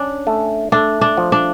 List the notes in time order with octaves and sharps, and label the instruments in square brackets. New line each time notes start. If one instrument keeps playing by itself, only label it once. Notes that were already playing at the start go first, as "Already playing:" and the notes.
Already playing: [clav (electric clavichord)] C#4 [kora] D4
[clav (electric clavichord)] A3
[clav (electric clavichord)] A3 [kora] D4
[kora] D4
[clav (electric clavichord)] F3
[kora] D4